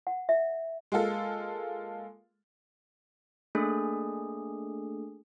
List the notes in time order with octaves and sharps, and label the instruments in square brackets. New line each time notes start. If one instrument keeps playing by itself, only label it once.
[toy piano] F#5
E5
[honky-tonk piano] G#3 A#3 F4 A4
[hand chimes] A3 A#3 D4 G#4 A4